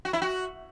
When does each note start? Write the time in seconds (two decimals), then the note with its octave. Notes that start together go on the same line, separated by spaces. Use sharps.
0.05 F#4
0.13 E4
0.22 F#4